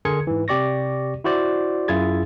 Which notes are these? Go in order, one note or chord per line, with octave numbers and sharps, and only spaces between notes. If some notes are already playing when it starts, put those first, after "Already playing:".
D3 G#4 A#4 C6 G#6 C#7
G#2 E3
C3 G4 D5 C#6 A#6
E4 F#4 C5 D5
F#2 E4 F4 G#4 G#6 A6